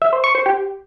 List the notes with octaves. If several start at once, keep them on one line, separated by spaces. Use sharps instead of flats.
E5
C5
C#6
C5
G4